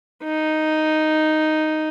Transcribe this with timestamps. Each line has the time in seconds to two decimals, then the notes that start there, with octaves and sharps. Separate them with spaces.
0.23 D#4